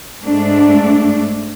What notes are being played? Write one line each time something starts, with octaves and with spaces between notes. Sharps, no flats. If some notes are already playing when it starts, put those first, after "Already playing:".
G#2 A3 D4